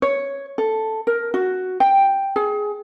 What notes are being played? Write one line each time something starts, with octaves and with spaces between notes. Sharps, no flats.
C#5
A4
A#4
F#4
G5
G#4